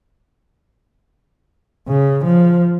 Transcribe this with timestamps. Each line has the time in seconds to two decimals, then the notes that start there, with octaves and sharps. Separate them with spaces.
1.88 C#3
2.25 F3